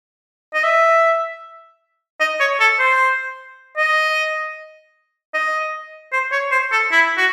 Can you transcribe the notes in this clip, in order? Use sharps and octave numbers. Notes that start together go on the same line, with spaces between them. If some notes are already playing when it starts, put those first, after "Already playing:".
D#5
E5
D#5
C#5
A4
C5
D#5
D#5
C5
C#5
C5
A4
E4
F#4